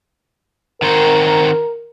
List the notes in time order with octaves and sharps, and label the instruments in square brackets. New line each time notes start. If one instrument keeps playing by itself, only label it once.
[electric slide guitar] D#3 C4 F#4 [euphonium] A#4